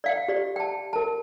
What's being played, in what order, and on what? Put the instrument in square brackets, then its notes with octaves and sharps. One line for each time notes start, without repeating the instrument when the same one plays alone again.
[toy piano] D5 F5 G5
G4 D5
G5 A5
A#4 A5